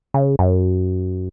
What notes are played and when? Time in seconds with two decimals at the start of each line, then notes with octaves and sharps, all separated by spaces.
0.14 C#3
0.39 F#2